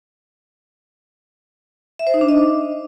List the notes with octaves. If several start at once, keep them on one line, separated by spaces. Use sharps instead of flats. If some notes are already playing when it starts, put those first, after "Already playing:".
E5
C5
D#4
D4
D#5